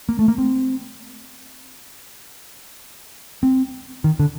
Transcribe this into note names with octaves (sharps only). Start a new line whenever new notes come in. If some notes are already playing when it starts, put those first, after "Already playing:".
A#3
A3
A#3
C4
C4
D#3
D3